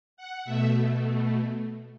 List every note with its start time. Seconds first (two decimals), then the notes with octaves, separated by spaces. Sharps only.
0.17 F#5
0.45 B2 A3 E5